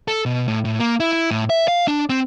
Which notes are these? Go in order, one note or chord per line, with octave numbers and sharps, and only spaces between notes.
A4
B2
A2
A2
A#3
E4
E4
A2
E5
F5
D4
C4